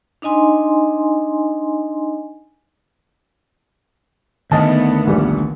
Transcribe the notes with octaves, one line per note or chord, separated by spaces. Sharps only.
D4 D#4 D#5 G#5 C6
D2 D#3 B3 D#5 A5
A#1 G3